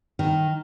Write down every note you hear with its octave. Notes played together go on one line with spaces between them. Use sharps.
D#3